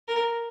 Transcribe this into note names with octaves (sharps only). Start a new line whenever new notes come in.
A#4